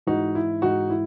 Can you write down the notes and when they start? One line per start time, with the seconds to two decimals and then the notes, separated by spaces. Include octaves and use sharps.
0.07 G#2 E3 D#4 F#4
0.35 E4
0.62 G#2 E3 D#4 F#4
0.90 E4